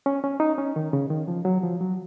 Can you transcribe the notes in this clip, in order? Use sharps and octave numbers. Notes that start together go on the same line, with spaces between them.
C#4
C#4
D#4
C#4
D#3
C#3
D#3
F3
F#3
F3
F#3